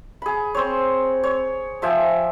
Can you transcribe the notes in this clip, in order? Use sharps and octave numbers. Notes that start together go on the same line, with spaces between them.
G#4 B5
C4 C#5
C#5
F3 E5 G5 G#5